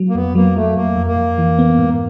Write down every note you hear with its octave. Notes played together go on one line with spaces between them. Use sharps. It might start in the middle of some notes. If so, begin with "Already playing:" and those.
Already playing: F#3
A#3
F2 B3
F#3 A#3
F#3 A3
F2 A#3
F2
A#3
F2
E3
B3
G#2